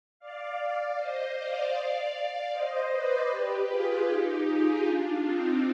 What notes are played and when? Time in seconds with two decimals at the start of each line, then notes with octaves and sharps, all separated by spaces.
0.19 D5 F5
0.97 C5 D#5
1.36 D5 F5
2.52 C5 D#5
2.91 B4 D5
3.30 G4 B4
3.68 F4 G#4
4.08 D#4 G4
4.46 F4 G#4
4.85 D4 F4
5.24 C4 D#4